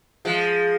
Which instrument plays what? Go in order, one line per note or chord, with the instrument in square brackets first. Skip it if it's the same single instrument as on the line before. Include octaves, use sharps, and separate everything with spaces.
[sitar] F3 G#3